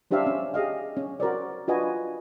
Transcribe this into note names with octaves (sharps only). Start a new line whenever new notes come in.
C#4 D4 G4 C5 E5 F5
C#4
G4 G#4 D#5 F5
C#4
F#4 A#4 C5 D5
D4 F4 F#4 B4 D#5 G#5